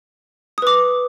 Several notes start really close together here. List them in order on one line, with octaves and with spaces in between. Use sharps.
D#6 B4 D6